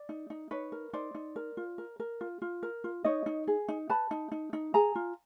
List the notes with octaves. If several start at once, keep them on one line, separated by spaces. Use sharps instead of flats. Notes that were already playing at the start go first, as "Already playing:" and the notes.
Already playing: D5
D#4
D#4
D#4 B4 C#5
A#4
D#4 C5 D5
D#4
A#4
F4
A#4
A#4
F4
F4
A#4
F4
D#4 C#5 D#5
D#4
G#4
D#4
B4 A5 B5
D#4
D#4
D#4
G#4 G#5 A#5
F4